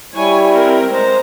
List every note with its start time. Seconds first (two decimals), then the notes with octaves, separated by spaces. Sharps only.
0.15 G3 E4 C#5 G#5
0.52 C4 A#4
0.91 G#3 C5 A#5